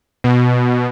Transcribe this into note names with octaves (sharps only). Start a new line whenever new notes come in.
B2